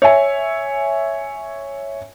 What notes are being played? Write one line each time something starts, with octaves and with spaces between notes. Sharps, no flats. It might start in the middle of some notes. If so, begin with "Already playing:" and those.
C#5 E5 G#5